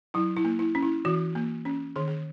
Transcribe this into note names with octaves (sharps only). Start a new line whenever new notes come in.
F#3 E4
E4
A#3
E4
C#4
E4
E3 F#4
A#3
C#4
D#3 G#4
G#4